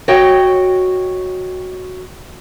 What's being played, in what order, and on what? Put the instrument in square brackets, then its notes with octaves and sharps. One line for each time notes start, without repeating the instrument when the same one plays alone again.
[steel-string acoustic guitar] F#4 C#5 D#5 G5